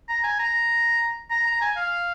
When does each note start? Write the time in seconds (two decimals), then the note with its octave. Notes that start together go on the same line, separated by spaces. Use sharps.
0.09 A#5
0.24 G#5
0.39 A#5
1.31 A#5
1.46 A#5
1.61 G#5
1.77 F5